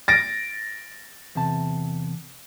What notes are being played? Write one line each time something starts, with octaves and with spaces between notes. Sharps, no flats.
A6 A#6 D7
E2 C3 A5